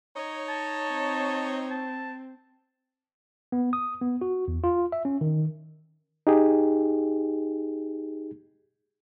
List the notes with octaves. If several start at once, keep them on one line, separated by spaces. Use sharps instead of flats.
D#4 C#5
A5
C4
A5
B3
D#6
B3
F#4
E2
F4
E5
C#4
D#3
D#4 G4 G#4